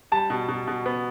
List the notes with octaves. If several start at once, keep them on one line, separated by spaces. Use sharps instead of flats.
G3 A5
B2
B2
B2
B3